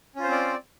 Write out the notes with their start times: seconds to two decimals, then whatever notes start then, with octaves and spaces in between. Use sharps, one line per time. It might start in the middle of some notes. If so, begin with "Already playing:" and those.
0.16 C#4
0.19 F4
0.23 C5
0.27 C4
0.31 D5